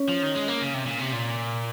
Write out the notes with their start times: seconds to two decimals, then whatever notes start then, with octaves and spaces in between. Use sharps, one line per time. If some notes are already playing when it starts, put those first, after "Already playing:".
Already playing: C#4
0.09 F3
0.23 D#3
0.35 G#3
0.48 A#3
0.62 C#3
0.74 C3
0.87 A#2
1.00 C3
1.13 A#2